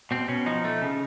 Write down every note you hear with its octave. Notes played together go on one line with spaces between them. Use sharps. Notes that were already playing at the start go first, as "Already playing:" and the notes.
B2 C4
B2 C#4
F3 D#4
A3
C#3